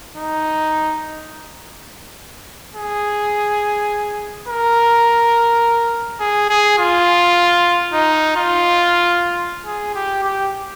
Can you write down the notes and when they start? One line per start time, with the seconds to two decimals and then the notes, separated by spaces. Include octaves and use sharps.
0.17 D#4
2.75 G#4
4.48 A#4
6.20 G#4
6.49 G#4
6.78 F4
7.93 D#4
8.36 F4
9.66 G#4
9.95 G4
10.23 G4